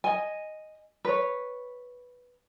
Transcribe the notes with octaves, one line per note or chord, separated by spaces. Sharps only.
D#5 G#5
B4 C#5